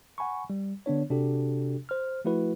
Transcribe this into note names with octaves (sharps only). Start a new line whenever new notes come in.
F#5 G#5 B5 C#6
G3
D3 B3 D4 C#5
C3 D4 F#4 G4 A4
C5 F6
F3 A3 E4 F#4 B4